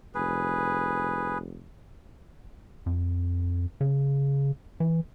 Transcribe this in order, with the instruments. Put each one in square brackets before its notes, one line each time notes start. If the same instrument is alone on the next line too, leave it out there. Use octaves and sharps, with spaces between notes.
[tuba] F1 [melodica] G#4 B4
[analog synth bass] F2
C#3
E3